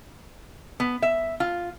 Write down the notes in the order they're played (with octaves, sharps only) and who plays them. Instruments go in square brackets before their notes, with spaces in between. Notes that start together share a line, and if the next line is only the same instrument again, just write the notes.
[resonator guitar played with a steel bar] B3
E5
F4